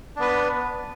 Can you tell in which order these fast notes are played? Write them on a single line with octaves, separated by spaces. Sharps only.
D4 B3 B4